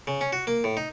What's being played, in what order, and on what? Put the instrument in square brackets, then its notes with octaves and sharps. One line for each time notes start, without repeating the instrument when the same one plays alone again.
[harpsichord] C#3
C#4
F#4
A#3
A2
D#4